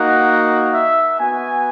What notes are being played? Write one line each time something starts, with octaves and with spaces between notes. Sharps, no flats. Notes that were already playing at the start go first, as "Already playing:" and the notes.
Already playing: A#3 D#4 F#4 F#5
E5
B3 F#4 G#5